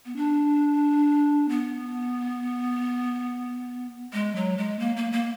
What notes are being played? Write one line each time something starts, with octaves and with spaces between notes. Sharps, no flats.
B3
D4
B3
G#3
F#3
G#3
A#3
A#3
A#3